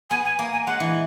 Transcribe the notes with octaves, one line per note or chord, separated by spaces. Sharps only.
B3 G#5
G#5
A#3
G#5
G#3 F#5
E3